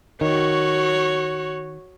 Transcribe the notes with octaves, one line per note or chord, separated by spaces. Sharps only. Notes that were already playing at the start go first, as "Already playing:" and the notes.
D#3 F#4 C#5